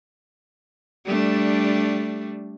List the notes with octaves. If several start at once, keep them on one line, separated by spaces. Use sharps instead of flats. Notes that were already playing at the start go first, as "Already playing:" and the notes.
G3 A3 D4